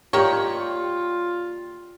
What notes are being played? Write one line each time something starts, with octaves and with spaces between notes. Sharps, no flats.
D#3 A#3 F4 G4 C#5 D5 G5